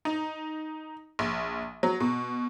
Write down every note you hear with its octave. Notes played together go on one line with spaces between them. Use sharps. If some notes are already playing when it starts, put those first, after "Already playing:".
D#4
A#1
F#3
B2